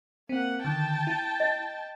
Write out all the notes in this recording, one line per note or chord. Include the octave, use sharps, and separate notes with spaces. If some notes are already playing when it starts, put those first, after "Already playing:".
A#3 C4 F#5
D3 D#3 G5 A5
E4 A6
D#5